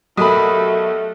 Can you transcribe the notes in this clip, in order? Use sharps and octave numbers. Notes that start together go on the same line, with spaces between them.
B1 A3 G4 A4 A#4 B5 D#6